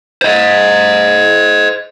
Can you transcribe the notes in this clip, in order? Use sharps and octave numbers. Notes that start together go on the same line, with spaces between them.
C5 D#5